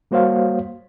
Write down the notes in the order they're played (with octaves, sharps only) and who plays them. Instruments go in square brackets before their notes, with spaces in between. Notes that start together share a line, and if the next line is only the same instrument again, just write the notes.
[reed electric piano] G3 A#3 F#4 C5 C#5 F5